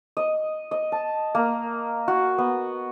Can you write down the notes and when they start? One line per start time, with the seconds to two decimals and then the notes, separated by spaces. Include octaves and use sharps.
0.17 D#5
0.71 D#5
0.92 A5
1.35 A#3
2.08 F#4
2.38 B3